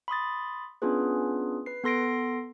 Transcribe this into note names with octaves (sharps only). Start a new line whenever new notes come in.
B5 C6 D#6 A6
B3 C#4 D4 F4 G#4 B4
B4 C7
B3 A4 C6 A#6 C7 D7